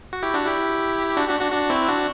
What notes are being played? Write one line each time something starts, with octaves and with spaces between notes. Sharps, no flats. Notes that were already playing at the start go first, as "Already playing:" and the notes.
F#4
E4 G4
D4 F#4
E4 G4
D4 F#4
D4 F#4
D4 F#4
D4 F#4
C4 E4
D4 F#4